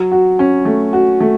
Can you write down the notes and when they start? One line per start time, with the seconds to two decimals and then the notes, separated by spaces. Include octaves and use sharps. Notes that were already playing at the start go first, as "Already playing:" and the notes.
Already playing: F#3
0.12 F#4
0.39 C#4
0.65 A3
0.93 F#4
1.20 A3